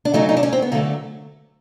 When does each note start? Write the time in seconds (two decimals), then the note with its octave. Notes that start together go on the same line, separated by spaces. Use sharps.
0.05 D4
0.14 C#3 F#3 A3 D#4
0.29 D#4
0.37 D4
0.43 C#4
0.52 C4
0.62 B3
0.72 D3 F#3 A3 A#3